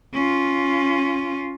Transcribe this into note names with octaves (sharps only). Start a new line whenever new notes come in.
C#4 F4